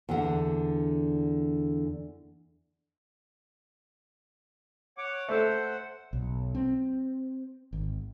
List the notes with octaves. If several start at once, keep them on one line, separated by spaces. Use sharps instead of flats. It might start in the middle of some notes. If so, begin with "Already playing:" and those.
E2 D3 D4 F#5
C#5 F#5 D6
A3 A4 C5 F#5
B1
C4
G#1